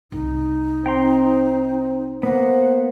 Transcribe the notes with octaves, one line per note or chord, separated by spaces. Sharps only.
C2 D#4
C4 G5 A#5 C6
A#3 B3 C5 F#5